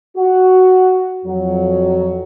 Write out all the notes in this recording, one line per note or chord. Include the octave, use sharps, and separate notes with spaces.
F#4
F2 F#3